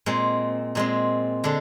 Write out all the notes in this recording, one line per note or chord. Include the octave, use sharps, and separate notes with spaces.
A#2 G#3 C4
A#2 G#3 C4
D3 G#3 D4